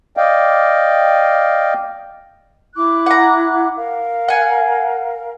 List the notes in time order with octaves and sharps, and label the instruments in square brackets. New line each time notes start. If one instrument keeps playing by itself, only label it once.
[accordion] D5 D#5 F5 G5
[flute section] E4 D6 F#6
[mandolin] F#5 A#5
[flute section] A#4 F5
[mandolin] F#5 G#5